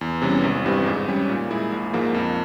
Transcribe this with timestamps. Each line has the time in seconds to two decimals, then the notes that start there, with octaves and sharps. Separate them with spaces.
0.01 E2
0.22 C3 E3 G3 C#4
0.44 G#1
0.65 G2 E3 G3 C4
0.86 G#2
1.08 G3 C#4
1.29 A#2
1.51 G#3 E4 G#4
1.72 A#1
1.93 G#2 F3 A#3
2.14 F2